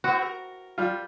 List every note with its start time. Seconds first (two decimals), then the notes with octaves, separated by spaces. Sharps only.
0.04 B3 C4 E4 F#4
0.22 A#4
0.78 G3 F4